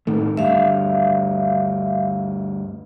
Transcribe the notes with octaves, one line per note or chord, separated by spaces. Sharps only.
A2 D#3 A3
D2 G2 E5 F5